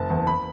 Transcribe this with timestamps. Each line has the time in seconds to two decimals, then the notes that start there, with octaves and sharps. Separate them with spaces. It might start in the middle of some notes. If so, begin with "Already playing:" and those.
Already playing: F#1 A5
0.10 E2
0.27 B5